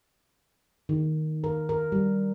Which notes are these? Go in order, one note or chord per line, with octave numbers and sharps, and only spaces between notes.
D#3
A#4
A#4
G3